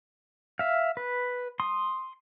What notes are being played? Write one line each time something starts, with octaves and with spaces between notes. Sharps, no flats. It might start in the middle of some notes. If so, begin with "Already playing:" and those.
E5 F5
B4
C6 D#6